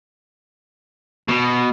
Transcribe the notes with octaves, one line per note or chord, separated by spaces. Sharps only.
B2